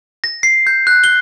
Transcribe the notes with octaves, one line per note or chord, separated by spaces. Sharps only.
A#6
C7
G6
F#6
G7